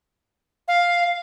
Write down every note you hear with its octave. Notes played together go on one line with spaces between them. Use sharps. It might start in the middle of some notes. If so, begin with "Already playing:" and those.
F5